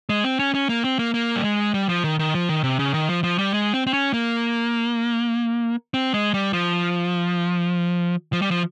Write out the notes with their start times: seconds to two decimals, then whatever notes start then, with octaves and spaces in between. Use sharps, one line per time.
0.09 G#3
0.24 C4
0.39 C#4
0.55 C#4
0.69 A#3
0.84 C4
0.99 A#3
1.14 A#3
1.36 G3
1.44 G#3
1.74 G3
1.89 F3
2.04 D#3
2.19 D#3
2.34 F3
2.49 D#3
2.64 C3
2.79 C#3
2.94 D#3
3.09 F3
3.24 F3
3.38 G3
3.54 G#3
3.74 C4
3.87 C4
3.93 C#4
4.14 A#3
5.94 C4
6.14 G#3
6.34 G3
6.53 F3
8.33 F3
8.42 G3
8.51 F3